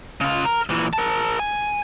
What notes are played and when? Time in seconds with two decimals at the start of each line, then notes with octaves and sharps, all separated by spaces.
0.21 C#3 F4
0.45 A#4
0.70 A#2 E3
0.93 A#4 A5
1.40 G#5